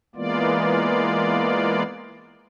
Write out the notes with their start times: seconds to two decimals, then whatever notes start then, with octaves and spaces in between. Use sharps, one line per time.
0.15 E3 G#3 A#3 B3 F4 D5